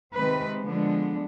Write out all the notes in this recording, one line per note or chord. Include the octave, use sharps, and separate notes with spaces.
C3 D#3 G#3 C4 B4
D3 F3 G#3 B3 D4